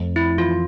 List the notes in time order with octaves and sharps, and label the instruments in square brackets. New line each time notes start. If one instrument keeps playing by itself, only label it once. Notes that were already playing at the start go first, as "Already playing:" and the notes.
Already playing: [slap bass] F2 A3
[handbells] E4
[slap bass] E3 [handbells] F4